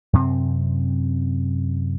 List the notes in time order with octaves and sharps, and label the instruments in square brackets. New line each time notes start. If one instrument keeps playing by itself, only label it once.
[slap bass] F#2 C3 C4